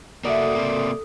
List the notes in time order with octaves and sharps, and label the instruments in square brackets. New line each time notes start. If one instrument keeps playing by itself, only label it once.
[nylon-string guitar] C#3 E5 [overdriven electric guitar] A#3 F#4 [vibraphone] A4 D#6 [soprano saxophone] D5
[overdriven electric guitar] C3 A#3